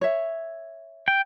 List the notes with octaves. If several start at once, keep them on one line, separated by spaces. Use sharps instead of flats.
C#5 E5
G5